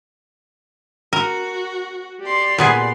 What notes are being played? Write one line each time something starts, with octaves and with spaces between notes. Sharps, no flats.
F#4 A#4
G4 D5 C6
A#2 B3 G#4